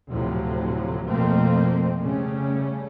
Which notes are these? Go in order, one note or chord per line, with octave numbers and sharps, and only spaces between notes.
D2 A2 C3 F3 F#3
F2 B2 F3 A3 A#3 C4
C#3 G3 A3 C#4